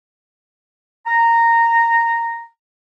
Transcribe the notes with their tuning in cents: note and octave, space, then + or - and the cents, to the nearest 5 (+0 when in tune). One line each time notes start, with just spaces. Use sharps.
A#5 -10